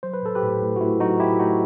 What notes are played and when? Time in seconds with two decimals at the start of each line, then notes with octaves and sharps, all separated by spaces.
0.03 F#3 C5
0.14 B4
0.23 A2 A4
0.35 G4 B4
0.43 A2
0.62 A2
0.76 F#4
0.81 A3 E4
1.00 F#3 D#4 F#4
1.20 A2 E4 G4
1.40 A3 D#4 F#4